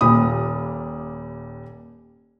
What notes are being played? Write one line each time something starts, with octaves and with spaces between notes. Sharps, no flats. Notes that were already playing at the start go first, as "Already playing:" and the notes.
D#1 A#2 G4 B5 D#6